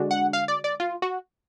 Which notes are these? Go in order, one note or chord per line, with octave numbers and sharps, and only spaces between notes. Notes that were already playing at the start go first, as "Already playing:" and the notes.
Already playing: D3 G#3 D4 F#4
F#5
F5
D5
D5
F4
F#4